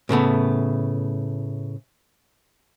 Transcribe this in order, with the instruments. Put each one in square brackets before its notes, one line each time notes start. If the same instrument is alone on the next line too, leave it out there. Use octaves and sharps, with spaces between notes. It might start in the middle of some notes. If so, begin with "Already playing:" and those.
[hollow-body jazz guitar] A2 C#3 A3 B3